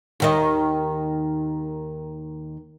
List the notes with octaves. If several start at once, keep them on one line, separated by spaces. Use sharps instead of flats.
D#2 D#3 D#5